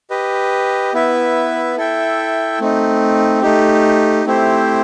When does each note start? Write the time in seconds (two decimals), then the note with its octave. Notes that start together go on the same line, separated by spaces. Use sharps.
0.10 G4 B4 D#5
0.94 B3 E4 B4 E5
1.77 E4 A4 E5 G5
2.60 A3 C4 D#4
3.42 A3 D#4 G4
4.26 A3 C4 E4 G4 C5